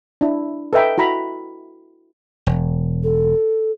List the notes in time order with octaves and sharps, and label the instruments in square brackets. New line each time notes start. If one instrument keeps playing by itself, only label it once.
[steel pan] D4 E4
A4 B4 D#5 E5 G5 A#5
E4 F#4 A#5 B5
[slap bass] E1
[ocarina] A4